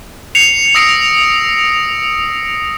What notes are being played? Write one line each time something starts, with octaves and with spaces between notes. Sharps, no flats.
C7 C#7 F7
D#6 E6 A#6 C7 D7 F7